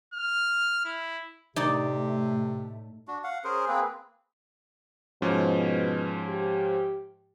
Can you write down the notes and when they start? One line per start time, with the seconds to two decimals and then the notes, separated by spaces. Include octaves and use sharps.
0.14 F6
0.85 E4
1.56 A2 C3 A3 D#4 D5
3.08 D4 F#4
3.24 F5 F#5
3.44 C#4 G#4 A#4 C5
3.68 A#3 C4 G#4 B4
5.22 G#2 B2 F3 C#4
6.29 G4